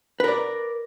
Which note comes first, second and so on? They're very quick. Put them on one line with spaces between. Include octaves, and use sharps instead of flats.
B4 A#4 D5